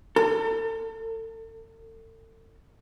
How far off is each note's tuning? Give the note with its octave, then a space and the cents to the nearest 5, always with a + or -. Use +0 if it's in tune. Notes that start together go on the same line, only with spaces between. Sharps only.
A4 +40